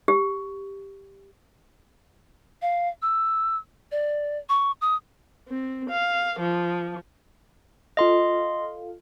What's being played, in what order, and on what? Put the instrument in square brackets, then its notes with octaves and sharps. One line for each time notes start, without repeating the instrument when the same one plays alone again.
[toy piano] G4
[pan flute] F5
E6
D5
C#6
D#6
[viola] C4
F5
F3
[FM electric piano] F4 A4 F5 [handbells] D#5 C6